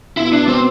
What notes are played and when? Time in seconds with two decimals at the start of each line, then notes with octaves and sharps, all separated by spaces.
0.17 B2 E4
0.33 D4
0.48 C4